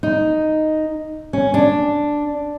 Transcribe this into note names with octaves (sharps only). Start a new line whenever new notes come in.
D#4
C#4
D4